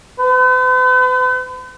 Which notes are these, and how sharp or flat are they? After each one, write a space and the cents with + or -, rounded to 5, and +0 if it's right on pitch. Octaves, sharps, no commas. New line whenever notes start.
B4 +45